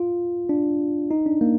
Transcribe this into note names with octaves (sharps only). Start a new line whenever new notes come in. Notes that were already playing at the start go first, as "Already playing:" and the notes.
Already playing: F4
D4
D#4
D4
A#3